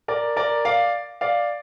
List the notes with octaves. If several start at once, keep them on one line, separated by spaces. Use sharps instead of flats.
A#4 D5
A#4 D5
D5 F5
D5 F5